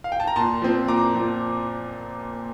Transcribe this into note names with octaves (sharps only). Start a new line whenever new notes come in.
F5
G5
A5
A#5
A#2 A5 C6
F3 C4
A#2 A#5 D6
F3 C4